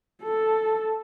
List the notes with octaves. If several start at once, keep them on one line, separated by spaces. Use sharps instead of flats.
A4